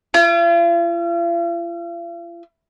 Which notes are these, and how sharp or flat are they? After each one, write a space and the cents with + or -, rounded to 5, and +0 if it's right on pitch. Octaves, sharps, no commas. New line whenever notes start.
F4 -45